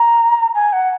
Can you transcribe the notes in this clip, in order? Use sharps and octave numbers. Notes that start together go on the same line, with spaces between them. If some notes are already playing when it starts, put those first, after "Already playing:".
Already playing: A#5
G#5
F#5